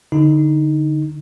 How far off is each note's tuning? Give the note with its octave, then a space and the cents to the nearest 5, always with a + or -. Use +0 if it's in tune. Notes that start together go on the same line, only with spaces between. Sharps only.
D3 +0 D#4 +0